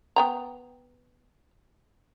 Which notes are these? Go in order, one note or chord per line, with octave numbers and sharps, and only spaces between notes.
B3 G5 A#5